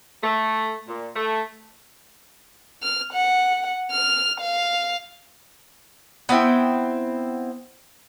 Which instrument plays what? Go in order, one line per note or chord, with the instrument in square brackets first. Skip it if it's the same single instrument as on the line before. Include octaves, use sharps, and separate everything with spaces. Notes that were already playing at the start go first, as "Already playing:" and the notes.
[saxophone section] A3
A#2
A3
[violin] F6
F#5
F6
F5
[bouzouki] B3 C4 E4 G5